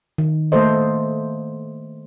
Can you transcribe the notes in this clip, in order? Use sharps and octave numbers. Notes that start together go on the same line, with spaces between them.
D#3
A3 A#3 A4 C5 D#5